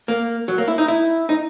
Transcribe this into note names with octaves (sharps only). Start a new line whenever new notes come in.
A#3
F#3
A#3
E4
D#4
E4
D#4